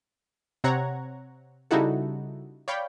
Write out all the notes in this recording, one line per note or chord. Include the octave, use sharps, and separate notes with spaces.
C3 C4 C#5 F#5 A#5 G#6
C#3 G3 D#4 E4 F#4 A4
C#5 D5 F5 G5 B5